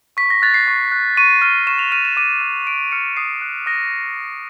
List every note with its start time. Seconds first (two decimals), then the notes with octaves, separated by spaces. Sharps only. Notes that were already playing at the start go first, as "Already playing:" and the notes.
0.17 C#6 B6
0.30 A#6
0.42 F#6 A6
0.54 C7
0.68 C#6
0.92 F#6
1.17 C#6 D#7
1.42 F6 D#7
1.67 C#6 E7
1.79 F7
1.92 F6 D#7
2.05 E7
2.17 D6 D#7
2.41 F6
2.67 D6 D7
2.92 F6 C#7
3.17 D#6 C7
3.41 F#6
3.66 D#6 A#6